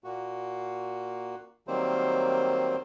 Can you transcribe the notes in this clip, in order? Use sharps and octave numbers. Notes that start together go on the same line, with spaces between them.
A#2 A#3 F#4
D#3 F#3 G3 A#3 C4 C5